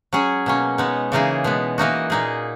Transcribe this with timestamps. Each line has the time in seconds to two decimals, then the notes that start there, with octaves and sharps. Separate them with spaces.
0.13 F#3 C#4 G#4
0.46 B2 A#3 C#4
0.78 G#3 B3 D#4
1.12 C#3 E3 A#3 D#4 G#4
1.44 B2 G#3 B3
1.78 E3 A#3 D#4 F#4
2.10 A#2 A#3 D#4 G#4